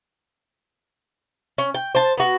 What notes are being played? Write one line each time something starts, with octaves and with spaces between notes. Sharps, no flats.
C#4
G5
C5 A5
B3 F#4